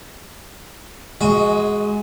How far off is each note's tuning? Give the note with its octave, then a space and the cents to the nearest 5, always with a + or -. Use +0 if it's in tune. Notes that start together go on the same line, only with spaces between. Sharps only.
G#3 +0 F#4 +0 D#5 +35